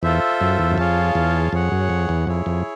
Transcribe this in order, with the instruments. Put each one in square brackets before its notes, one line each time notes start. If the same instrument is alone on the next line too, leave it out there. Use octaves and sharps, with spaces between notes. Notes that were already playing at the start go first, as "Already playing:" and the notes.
[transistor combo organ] E2 [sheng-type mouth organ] F4 A4 C5 E5
[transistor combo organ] F#2
E2
F#2
[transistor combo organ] F2 [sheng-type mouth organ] F4 G#4 C#5 F5 A5
[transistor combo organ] E2
[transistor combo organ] F2 [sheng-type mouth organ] G#4 C#5 F#5
[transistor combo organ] F#2
F2
E2
[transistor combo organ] F2 [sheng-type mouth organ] E4 G#4 C#5
[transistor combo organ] F2